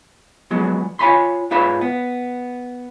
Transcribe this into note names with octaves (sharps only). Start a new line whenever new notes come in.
F3 F#3 G#3 B3
F4 C#5 D#5 G#5 B5 C6
G#2 F4 B4 C#5 E5 B5
B3